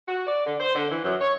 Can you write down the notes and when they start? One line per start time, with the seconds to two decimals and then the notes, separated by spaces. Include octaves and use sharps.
0.08 F#4
0.26 D5
0.46 D3
0.60 C5
0.75 D3
0.91 E3
1.04 F#2
1.20 C#5